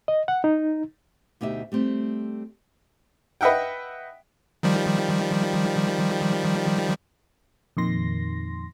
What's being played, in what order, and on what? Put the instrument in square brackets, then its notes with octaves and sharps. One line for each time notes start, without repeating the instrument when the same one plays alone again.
[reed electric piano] D#5
F#5
D#4
[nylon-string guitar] D2 B2 D#4 G4 E5
G3 A3 C4
[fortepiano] B4 D#5 E5 F#5 G5
[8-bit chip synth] D#3 F3 G3
[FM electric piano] F2 A#2 D#3 C6 A#6